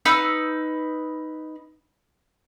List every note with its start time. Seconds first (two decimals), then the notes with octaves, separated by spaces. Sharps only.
0.05 D#4 B4 E6